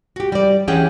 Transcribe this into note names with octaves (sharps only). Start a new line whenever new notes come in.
F#4 G4
G3 D5
E3 C#4 G4 G#4 F#5 G5